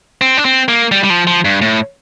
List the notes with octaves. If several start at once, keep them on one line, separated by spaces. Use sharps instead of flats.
C4
D4
C4
A#3
G3
G3
F3
F3
G2
A2